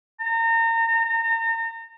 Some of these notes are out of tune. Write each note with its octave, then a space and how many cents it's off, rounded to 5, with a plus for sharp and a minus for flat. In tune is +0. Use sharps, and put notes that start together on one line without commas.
A#5 -35